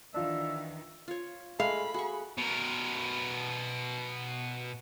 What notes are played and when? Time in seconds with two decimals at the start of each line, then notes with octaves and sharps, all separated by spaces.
0.14 D#3 E3 D4 F4 E5
1.08 F4 C#5
1.60 G#3 A3 F5 B5
1.94 F#4 G#4 C#6
2.38 B2 A#4